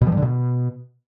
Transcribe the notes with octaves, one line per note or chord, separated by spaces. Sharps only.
B2
F3
G2
D3
B2